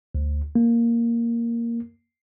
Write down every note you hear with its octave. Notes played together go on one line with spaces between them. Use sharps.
D2
A#3